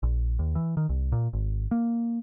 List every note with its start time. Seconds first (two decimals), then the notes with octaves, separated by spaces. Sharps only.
0.03 A#1
0.39 D#2
0.55 E3
0.77 D#3
0.89 C2
1.12 A#2
1.33 G#1
1.71 A#3